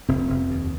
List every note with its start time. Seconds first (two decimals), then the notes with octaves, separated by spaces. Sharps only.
0.09 F1 C4
0.30 F1
0.51 D#2